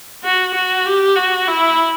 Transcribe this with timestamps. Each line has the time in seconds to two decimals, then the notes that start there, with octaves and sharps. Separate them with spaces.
0.23 F#4
0.54 F#4
0.86 G4
1.16 F#4
1.47 E4